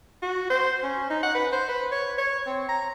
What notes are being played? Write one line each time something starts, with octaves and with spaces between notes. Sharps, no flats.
F#4
C5
C#4
D#4
F#5
B4
C5
B4
C#5
C#5
C4
A#5